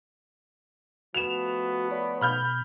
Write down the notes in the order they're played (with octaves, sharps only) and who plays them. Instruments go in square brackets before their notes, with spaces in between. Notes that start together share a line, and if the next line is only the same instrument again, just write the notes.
[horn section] F3 A3 B3 [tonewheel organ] F#4 [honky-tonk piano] E7 F7
[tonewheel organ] C#5 D5 B5
[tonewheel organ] B2 [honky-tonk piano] B5 F6 G6